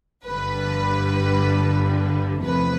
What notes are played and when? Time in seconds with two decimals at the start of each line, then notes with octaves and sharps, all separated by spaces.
0.25 G1 G2 D3 G3 B4
2.43 E2 C3 F3 A3 B4